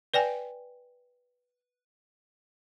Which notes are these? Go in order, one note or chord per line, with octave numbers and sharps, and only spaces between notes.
B4 D5 G5 G#5